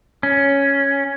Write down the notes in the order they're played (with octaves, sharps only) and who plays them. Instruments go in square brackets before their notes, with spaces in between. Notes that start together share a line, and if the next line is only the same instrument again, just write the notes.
[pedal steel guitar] C#4